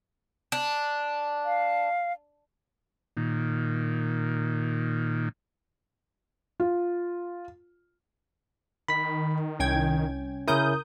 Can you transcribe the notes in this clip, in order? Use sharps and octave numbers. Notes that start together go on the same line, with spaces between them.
D4
F5
A#2 D#3
F4
D#3 B5 B6
C2 C#4 G5 G#6
C#3 C#4 E4 A#4 D#6 G6